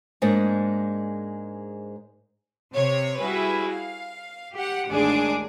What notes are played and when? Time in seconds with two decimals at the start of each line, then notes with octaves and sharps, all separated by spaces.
0.22 G#2 G#3 A#3 D4
2.73 C3 C#5
3.19 G3 E4 F#4 G#4 B4 E5
3.72 F5
4.52 G4 F#5
4.88 A1 D#2 G#3 D4 G#4 D6